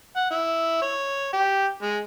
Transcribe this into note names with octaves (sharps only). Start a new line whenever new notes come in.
F#5
E4
C#5
G4
G#3